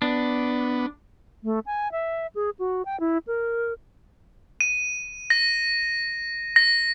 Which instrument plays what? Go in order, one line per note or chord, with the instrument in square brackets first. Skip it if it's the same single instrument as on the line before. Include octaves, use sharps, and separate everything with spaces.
[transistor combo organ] B3 [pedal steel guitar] D4
[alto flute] A3
G#5
E5
G#4
F#4
G5
E4
A#4
[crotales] D#7
A#6
A#6